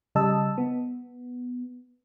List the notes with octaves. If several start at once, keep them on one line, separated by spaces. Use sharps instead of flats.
C#3 G3 D#5 A5 E6
B3